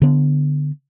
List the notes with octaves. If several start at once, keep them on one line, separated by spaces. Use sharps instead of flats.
D3 B3